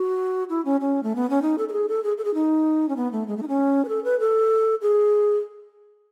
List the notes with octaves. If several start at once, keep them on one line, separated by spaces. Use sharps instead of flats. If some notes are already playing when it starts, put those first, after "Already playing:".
Already playing: F#4
E4
C#4
C#4
A3
B3
C#4
D#4
A4
A4
G#4
A4
G#4
A4
G#4
D#4
C#4
B3
A3
G#3
A3
D#4
C#4
B4
A4
B4
A4
G#4